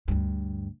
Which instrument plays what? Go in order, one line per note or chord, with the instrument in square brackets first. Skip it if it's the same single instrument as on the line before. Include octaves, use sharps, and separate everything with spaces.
[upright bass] D2 G2